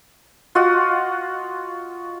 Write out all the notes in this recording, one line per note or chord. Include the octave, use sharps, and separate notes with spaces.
F4 F#4 D#5 F#5